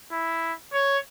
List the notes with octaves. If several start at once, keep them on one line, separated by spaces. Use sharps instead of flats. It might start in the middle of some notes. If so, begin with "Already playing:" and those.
E4
C#5